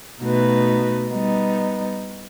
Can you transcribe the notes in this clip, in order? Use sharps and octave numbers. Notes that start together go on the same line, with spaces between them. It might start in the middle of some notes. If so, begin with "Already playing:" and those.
B2 A3 D#4 F#4 B4
G3 B3 D#4